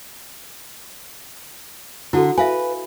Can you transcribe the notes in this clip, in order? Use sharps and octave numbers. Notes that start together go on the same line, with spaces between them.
D3 E4 F#4 A4
B4 E5 F5 G#5